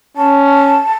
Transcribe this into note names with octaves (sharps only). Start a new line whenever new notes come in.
C#4 A5